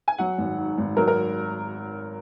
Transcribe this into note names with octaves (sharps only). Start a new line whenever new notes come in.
G#5
F#3 F#5
G#1
G#2
G#1
F#3 A#4
A#4